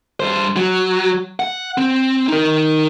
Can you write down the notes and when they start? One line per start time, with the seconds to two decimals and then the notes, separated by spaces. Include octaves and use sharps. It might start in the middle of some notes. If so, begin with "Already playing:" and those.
0.20 G2 C5
0.57 F#3
1.40 F#5
1.78 C4
2.28 D#4 A#4